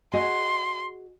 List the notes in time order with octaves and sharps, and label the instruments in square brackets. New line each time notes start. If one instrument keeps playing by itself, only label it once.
[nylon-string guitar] F#4 G#4 D#5 [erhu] C6